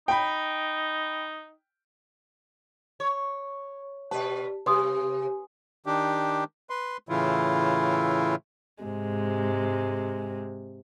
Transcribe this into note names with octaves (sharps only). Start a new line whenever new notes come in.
D#4 G5 B5
C#5
B2 G4 B4 D5 A5
C3 G4 B4 C6 D#6
D#3 D4 G4
B4 C6
A2 C#3 E3 E4 F4
G#2 C3 G#3